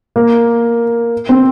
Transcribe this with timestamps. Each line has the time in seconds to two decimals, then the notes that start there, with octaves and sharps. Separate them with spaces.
0.16 A#3
1.29 C4